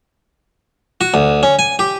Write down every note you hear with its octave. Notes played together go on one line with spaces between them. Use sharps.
F#4
D2
C#4
G#5
G4